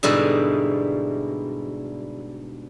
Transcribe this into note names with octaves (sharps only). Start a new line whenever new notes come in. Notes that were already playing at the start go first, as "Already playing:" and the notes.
G#2 B2 D3 G3 E4 G#4